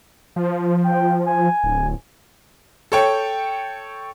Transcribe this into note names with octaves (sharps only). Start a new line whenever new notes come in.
F3
G5
G#5
D1
A4 C#5 G5